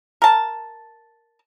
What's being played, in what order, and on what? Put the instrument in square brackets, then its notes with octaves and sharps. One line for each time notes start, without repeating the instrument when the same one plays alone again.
[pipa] A#4 A5